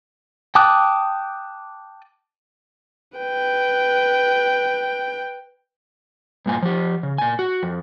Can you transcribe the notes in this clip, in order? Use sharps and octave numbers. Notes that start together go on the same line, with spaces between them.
G5 A5 D6 D#6 F#6
B4 G5
G2 A#2 G#5
F3 G4
C#3
A#2 G#5
F#4
F2